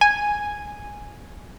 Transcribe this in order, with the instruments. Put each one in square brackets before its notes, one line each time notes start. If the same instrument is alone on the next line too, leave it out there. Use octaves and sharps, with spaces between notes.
[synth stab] G#5